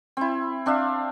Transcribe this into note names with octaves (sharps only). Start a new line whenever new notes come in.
C4 E4
C4 D4 E5 F5